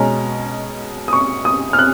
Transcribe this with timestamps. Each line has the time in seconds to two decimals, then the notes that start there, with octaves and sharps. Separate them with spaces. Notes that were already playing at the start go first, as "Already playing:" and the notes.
Already playing: B2 G#3 C#4 A#5
1.08 D#6
1.13 C#6
1.45 D#6
1.73 F6
1.79 F#6